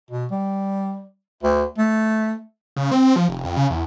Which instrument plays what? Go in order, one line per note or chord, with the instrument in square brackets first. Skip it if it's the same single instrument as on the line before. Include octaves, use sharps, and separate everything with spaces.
[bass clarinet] B2
G3
D2
A3
[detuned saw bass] C#3
C4
F3
F1
F2
C#3
E2